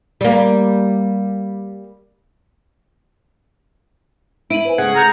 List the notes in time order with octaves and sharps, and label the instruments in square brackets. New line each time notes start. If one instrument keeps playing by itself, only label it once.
[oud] G3 A#3
[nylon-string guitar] E4 [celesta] D7 D#7 F#7
[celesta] B4 C5 G#5
[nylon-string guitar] C#3 A3 [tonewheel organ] G#4 F#5
[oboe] A#5 [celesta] F6 G6 F7